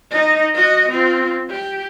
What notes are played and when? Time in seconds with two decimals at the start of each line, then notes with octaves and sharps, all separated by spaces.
0.11 D#4 D#5
0.54 F#4 D#5
0.88 C4 F4
1.50 G4